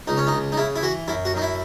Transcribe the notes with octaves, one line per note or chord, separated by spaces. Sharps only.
C#2 D#4
C#4
D#4
C#2
D#4
C#3 E4
E4
E3 F#4
F#2 E4
F#4
F#2 D#4
E4